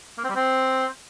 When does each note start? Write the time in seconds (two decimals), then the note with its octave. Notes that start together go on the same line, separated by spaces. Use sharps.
0.18 A#3
0.24 C4
0.30 G3
0.35 C4